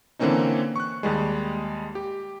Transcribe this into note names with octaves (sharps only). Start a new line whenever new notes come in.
D3 E3 A#3 C4 C#4 D#4
C#6 F#6
D#2 G3 G#3
G4